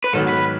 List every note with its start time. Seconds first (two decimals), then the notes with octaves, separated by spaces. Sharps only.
0.04 B4
0.13 G#2 D#3 F#3 B3 F#4 A4
0.29 B4